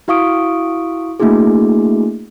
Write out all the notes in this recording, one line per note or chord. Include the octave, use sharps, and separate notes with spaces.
E4 F#4 F5 C#6 D#6 D7
A3 A#3 D4 E4 F#4 G#4